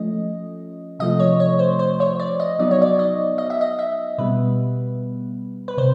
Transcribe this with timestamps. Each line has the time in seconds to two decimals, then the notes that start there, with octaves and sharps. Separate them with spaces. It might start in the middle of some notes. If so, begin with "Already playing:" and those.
Already playing: F3 A3 C#4 D#5
0.99 C3 F3 A3 D#5
1.19 C#5
1.40 C#5
1.59 C5
1.79 C5
2.00 C#5
2.20 D5
2.40 D#5
2.59 F#3 B3 D#4 D5
2.71 C#5
2.82 D5
2.99 D#5
3.38 D#5
3.50 E5
3.61 D#5
3.79 E5
4.18 B2 G3 B3 B4
5.68 B4
5.78 C3 C5